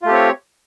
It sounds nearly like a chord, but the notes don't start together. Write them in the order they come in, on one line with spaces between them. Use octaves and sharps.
F4 A3 G4 C4 C#5